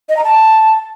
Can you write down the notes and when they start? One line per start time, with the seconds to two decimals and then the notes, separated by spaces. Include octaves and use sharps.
0.09 D#5
0.17 A#5
0.24 A5